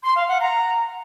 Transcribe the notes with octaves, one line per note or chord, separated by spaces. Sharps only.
C6
F5
F#5
A#5